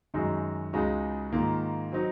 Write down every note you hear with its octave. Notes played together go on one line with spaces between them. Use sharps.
F#2 D#3 G#3 D#4 F#4
C#2 C#3 G#3 D#4 F#4
G#2 D#3 A#3 F4
F#3 C4 D#4 F#4